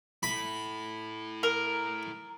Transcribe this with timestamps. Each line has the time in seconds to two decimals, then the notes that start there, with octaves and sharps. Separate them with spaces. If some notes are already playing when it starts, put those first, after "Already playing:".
0.23 E4 A4 B5
1.43 A#4